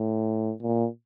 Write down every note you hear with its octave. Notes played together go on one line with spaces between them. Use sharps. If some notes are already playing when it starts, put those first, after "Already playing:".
Already playing: A2
A#2